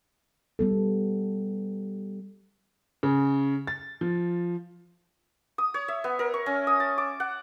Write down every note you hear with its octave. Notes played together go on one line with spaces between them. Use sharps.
G3 B3 A4
C#3
A6
F3
D#6
C#5
E5
B3
A#4
C#6
C#4
D#6
A5
D6
F#5